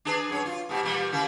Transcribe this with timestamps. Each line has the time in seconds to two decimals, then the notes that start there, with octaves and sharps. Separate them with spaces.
0.05 D4 G#4 B4
0.30 F#2 C#5
0.46 F4
0.69 G#2 B2 G4
0.83 A#2 E3 G3
1.12 C#3 E4 A#4